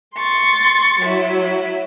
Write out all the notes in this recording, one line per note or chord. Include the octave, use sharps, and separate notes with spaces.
C6 C#6 A6
F#3 E4